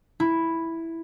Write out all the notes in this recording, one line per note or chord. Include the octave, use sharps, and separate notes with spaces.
E4